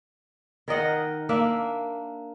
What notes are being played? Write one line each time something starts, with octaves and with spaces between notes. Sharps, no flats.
D#3 A#4 D#5 F#5
A#3 D4 E5 F5